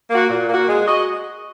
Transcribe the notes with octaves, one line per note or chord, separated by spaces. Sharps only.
A#3 F#4
A#2
A#3 F#4
G#3
F#4 D#5